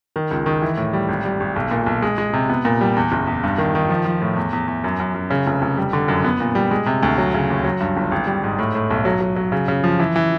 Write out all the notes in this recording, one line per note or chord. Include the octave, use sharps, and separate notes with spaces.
D#3
C#2
D#3
E3
A2
G3
G#1
G3
G#1
B1
A#2
B1
G#3
G#3
C3
B3
A#2
G3
E2
F#1
E2
G2
D#3
D#3
F3
F3
A2
E2
E2
E2
F#2
F#2
F#2
C#3
F1
F1
G3
D3
F#2
B3
A#2
G3
G#3
C3
D2
F#3
C#3
D#2
F#3
G2
G1
G#1
G3
G#2
A2
A2
B1
F#3
F#3
F#3
C#3
C#3
F3
E3
E3